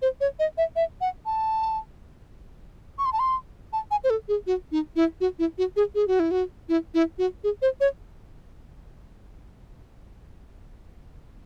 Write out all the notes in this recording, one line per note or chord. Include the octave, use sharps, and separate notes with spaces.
C5
C#5
D#5
E5
E5
F#5
A5
C#6
C6
A5
C6
A5
G#5
C5
A4
G#4
F#4
D#4
E4
F#4
E4
F#4
G#4
G#4
F#4
E4
F#4
E4
E4
F#4
G#4
C5
C#5